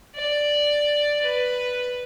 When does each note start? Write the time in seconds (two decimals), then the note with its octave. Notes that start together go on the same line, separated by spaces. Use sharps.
0.16 D5
1.21 B4